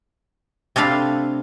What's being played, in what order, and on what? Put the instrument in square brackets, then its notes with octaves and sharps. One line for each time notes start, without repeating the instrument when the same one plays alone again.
[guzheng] C3 A3 D4 F5 B5